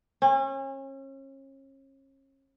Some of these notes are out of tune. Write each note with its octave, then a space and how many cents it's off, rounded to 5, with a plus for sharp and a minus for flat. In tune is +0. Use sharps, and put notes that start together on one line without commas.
C#4 -35